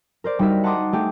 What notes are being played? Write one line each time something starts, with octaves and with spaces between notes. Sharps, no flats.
A#4 C5 D5
G3 D#4 F#4 A#4 E5
F#5 A5 A#5 C6 D6 D#6
A3 G4 G#4